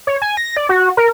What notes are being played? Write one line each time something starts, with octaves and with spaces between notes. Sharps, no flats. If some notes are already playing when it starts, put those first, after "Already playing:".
C#5
G#5
A#6
D5
F#4
A#4